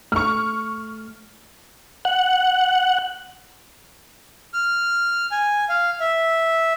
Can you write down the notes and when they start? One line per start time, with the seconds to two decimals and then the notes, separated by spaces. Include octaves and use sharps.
0.12 A3 C#6 F6
2.05 F#5
4.54 F6
5.32 G#5
5.69 F5
6.01 E5